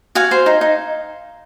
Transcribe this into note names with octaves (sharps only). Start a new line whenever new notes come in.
F#4 F5 G#5
C5
D#4
D#4